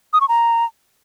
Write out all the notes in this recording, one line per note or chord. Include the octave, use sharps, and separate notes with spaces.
D#6
C#6
A#5